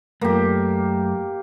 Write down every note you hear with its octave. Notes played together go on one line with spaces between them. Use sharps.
F#2 A3 A#3 G4